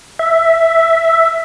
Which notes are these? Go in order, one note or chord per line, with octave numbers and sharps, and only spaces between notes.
E5